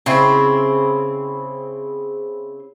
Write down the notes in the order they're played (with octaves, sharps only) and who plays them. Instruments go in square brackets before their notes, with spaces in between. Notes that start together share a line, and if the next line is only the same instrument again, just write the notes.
[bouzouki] C#3 C4 E4